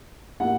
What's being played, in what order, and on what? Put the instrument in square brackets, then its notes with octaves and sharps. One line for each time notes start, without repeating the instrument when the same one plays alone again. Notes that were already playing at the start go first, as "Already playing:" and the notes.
[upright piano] A2 G3 A#3 F#5